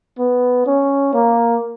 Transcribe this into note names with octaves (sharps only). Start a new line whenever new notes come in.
B3
C#4
A#3